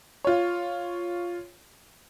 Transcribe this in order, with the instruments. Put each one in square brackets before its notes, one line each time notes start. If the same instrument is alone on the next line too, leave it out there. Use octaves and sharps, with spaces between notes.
[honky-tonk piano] F4 C#5